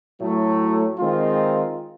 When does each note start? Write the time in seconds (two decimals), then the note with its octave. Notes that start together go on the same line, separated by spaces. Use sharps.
0.19 A2 F#3 A3
0.98 D#3 G#3 C4 F4